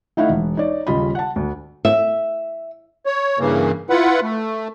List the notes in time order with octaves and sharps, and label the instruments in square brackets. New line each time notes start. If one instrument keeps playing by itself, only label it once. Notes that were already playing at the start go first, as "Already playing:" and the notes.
[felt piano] A3 D#4 E4 F5 F#5
E1
D#4 C#5 D5
D#1 C#3 G3 F4 D#5 B5
F#5 A5
D2
[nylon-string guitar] E5
[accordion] C#5
G2 C#3 E3 A#3
E4 F4 B4 F#5
A3